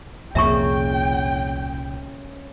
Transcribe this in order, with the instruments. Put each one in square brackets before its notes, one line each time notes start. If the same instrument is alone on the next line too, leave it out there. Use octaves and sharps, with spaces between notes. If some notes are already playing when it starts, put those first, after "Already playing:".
[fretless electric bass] C2 F2 A#2 [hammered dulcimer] C#3 [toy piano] E5 A#5 C#6 [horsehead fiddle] G5